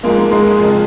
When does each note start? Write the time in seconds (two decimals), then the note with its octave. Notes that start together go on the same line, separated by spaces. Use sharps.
0.03 G#2 F3 G#3 A#3
0.31 G#3
0.59 F2 C#3 F3